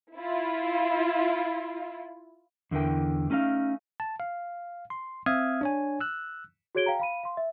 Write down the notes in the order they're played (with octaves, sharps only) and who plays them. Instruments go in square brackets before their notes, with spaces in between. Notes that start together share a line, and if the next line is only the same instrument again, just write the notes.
[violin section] E4 F4
[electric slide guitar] E2 D3 E3 A#4 G5
A3 C#4 D#4 B4 F5
[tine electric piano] A5
F5
C6
C4 E5 F5 D#6 F6 G#6
D4 C#5 G#5
E6 F#6
[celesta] F#4 G#4 C#5 G#6 D7 G7
F5 G5 A#5
F5 B5 D#7
F5 C6
E5